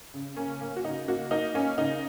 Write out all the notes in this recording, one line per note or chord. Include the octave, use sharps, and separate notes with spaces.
C#3
A#3 C#4
A#3
F#4
C#3 D#4
A#3 F#4
A#3 D#4
A#3 C#4
C#3 D#4